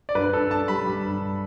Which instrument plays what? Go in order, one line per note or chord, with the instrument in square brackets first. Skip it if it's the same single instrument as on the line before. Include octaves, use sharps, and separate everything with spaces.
[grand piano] D5
G2 B4
G2 A4
D4 A5
G3 B5
G3
G2